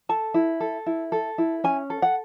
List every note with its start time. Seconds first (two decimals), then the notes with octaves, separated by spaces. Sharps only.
0.09 A4 A5
0.34 E4
0.60 A4
0.86 E4
1.12 A4
1.38 E4
1.64 C#4 G#5
1.90 A4
2.02 F#5